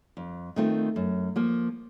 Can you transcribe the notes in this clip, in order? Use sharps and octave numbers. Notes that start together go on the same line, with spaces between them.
F2
D#3 A3 C4 F4
F#2
F3 A#3